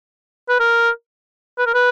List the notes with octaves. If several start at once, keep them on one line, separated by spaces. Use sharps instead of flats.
B4
A#4
B4
A#4
B4